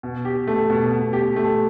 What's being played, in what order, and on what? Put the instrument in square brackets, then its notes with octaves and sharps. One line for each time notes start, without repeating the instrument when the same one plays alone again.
[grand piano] B2
G4
A3
B2
B2
G4
A3